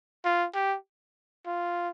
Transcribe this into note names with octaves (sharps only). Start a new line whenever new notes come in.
F4
G4
F4